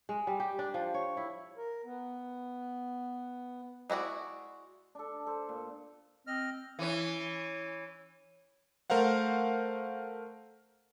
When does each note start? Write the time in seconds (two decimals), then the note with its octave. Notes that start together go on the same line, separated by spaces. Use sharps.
0.09 G#3
0.27 G3
0.40 G4
0.59 D4
0.74 F3
0.94 C#5
1.17 E4
1.57 A#4
1.84 B3
3.90 G#3 E4 F#4 D5
4.95 D4 A4
5.26 A4 C5
5.49 A#2
6.27 C4 D#5 F6
6.79 E3 C#4
8.90 A3 A#4 C5 F5 F#5